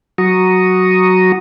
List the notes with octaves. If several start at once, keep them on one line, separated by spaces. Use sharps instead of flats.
F#3 F#4 A#5 C#6 D#6